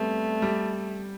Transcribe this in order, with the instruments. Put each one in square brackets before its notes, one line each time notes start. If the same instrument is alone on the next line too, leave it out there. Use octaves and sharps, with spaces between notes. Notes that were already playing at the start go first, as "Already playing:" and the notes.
Already playing: [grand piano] G3 B3 C4 [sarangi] A3
[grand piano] G3